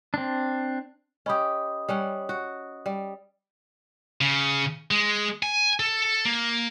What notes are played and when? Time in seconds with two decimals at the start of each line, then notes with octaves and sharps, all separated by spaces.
0.14 C4 D4
1.26 C#4 G4 D#5 B5 D#6
1.88 G3 C#4 F#5
2.29 F#4
2.86 G3
4.21 C#3
4.91 G#3
5.43 G#5
5.80 A4
6.25 A#3